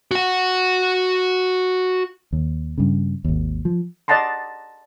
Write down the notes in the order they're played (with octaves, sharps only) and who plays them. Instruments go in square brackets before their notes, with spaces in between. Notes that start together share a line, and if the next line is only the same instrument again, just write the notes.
[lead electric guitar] F#4 F#5
[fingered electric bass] D#2
G2 C#3
G#1 D#2
F3
[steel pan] D5 D#5 F#5 A5 A#5 C6